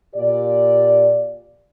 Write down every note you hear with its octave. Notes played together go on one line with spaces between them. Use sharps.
A#2 G4 D5